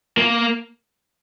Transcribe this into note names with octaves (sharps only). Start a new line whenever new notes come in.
A#3